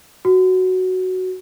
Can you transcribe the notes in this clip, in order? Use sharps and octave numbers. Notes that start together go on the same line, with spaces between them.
F#4